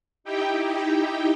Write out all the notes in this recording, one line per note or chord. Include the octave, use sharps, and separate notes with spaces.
D#4 E4 G4 G5